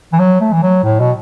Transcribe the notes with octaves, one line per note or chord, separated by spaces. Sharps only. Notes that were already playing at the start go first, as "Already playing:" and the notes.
E3
F#3
A3
E3
F#3
A2
B2